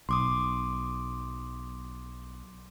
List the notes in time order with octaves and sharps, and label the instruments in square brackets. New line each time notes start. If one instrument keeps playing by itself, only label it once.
[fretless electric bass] B1 [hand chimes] C6 D6 D#6